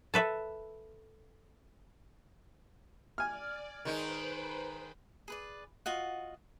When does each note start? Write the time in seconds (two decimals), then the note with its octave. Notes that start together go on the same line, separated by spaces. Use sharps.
0.14 A4 B4 E5
3.18 D5 G#5 F6
3.85 D#3 G#3 D#4 B4 C5 B5
5.28 G#4 B4 D5
5.86 F4 F#4 D#5 F#5